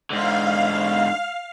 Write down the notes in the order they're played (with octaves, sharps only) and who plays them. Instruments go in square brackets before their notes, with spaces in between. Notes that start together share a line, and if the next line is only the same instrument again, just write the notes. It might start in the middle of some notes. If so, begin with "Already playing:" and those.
[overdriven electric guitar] G#2 D3 [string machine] F5